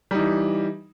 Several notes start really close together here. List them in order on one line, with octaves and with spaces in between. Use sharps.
G3 D#4 E3